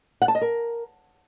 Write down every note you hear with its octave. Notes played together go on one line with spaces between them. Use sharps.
F#5
A5
D#5
A#4